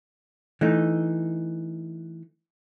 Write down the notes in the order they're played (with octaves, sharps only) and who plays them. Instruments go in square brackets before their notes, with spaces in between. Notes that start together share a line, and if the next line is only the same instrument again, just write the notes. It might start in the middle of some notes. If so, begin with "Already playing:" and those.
[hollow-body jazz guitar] E3 A3 D#4